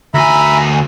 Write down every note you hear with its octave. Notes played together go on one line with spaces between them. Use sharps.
D2 E5 G#5 A#5 B5